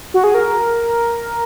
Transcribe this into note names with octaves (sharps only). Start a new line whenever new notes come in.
F#4
G#4
A#4